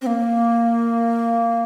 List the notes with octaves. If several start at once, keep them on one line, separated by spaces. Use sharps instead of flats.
C4
A#3